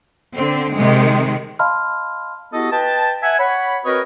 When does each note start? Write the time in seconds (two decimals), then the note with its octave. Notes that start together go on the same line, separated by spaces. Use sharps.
0.34 D3 C4
0.75 C3 D#3 G#3
1.59 D#5 F5 A5 B5 C6 F6
2.53 B3 E4 F#4 G4 A4 D#5
2.72 B4 D#5 G5 A5
3.23 E5 F#5 G#5
3.40 C#5 F#5 B5
3.85 C4 F#4 A#4 B4 C#5 D#5